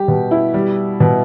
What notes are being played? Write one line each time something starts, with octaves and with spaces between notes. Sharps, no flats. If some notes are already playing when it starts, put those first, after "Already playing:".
Already playing: G3 G4
B2
E4
G3
B2